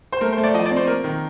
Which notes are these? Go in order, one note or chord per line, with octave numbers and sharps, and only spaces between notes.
C5
A3 A#4
C5
A3
D5
F3 D#5
D5
C4
C5
A#3 A#4
D#3